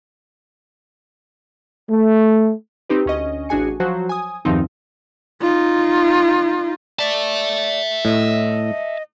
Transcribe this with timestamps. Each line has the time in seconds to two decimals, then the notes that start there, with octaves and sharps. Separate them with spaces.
1.90 A3
2.89 C4 D#4 G4 B4
3.06 D2 C#4 D#5
3.49 A1 D4 F#4 G#4 G#5 C#7
3.80 F3 F#3 F#4 C5
4.09 G#5 D#6
4.45 E2 G2 D#3 F3 C4 D#4
5.41 D#4 F4
6.99 D5 E5 A5
8.05 A2 D#5